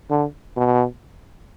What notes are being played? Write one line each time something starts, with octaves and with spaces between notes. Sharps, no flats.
D3
B2